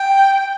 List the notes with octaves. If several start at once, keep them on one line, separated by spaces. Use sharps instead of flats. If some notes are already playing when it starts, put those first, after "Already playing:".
Already playing: G5